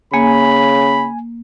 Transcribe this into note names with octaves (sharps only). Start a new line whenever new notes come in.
C#3 A#3 G#5 B5